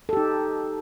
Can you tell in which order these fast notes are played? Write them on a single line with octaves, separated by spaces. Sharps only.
A4 G4 D#4